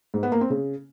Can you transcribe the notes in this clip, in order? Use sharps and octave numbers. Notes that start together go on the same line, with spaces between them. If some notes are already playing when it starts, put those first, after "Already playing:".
G#2
B3
A#3
C4
C#3